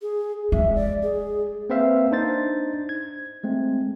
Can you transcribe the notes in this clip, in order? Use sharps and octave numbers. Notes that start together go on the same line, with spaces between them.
G#4
G#3 E5
D5
G#4
A#3 C4 B4 C5 E5 F5
D4 D#4 C5 A6
G#6
G#3 A3 C4